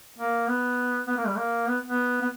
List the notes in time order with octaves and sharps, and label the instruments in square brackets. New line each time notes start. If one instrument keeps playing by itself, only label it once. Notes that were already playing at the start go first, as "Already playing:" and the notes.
[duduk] A#3
B3
B3
A#3
G3
A#3
B3
B3
B3